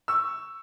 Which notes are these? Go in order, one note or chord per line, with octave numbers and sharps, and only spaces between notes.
C#6 E6